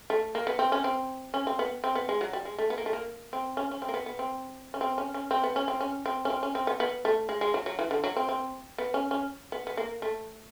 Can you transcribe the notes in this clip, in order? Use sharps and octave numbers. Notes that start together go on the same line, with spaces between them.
A3
A#3
B3
C4
C#4
C4
C#4
C4
B3
C4
B3
G#3
F#3
G3
G#3
A3
B3
A#3
A3
A#3
C4
C#4
C#4
C4
A#3
B3
B3
C4
C#4
C4
C#4
C#4
C4
B3
C#4
C4
C#4
C4
C#4
C4
C#4
C4
B3
B3
A3
G#3
G#3
F#3
F#3
E3
D3
F#3
C4
C4
B3
C#4
C#4
B3
B3
A#3
A3